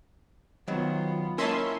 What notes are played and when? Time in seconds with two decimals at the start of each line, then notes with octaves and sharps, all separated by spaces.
0.68 D#3 F#3 B3 F4
1.38 A#3 C#4 E4 A#4 D#5 E5 A5 C6